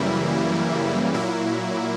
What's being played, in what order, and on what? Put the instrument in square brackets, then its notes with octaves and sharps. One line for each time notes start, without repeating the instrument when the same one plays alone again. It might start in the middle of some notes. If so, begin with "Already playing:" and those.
Already playing: [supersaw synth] F#2 C#3 E3 G3 A#3 E4
A#2 F#3 A#3 E4